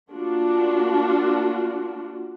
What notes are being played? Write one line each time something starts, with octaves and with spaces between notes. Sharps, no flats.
A#3 D4 F4 F#4